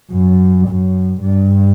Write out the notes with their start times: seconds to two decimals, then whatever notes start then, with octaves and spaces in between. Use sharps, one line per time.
0.11 F#2
0.67 F#2
1.22 G2